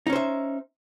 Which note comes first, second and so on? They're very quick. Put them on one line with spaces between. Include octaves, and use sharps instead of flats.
D#4 C#4 C5 E5